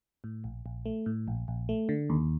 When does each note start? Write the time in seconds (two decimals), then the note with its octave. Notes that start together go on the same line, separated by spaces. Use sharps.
0.24 A2
0.44 A#1
0.66 A#1
0.86 A3
1.06 A2
1.28 A#1
1.48 A#1
1.69 A3
1.89 D3
2.10 D#2